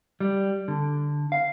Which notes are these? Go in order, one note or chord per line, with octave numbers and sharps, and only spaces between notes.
G3
D3
F5